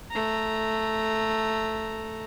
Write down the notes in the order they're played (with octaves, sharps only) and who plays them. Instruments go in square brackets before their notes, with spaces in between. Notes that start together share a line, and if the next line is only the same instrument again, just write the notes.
[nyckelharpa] A3 A#5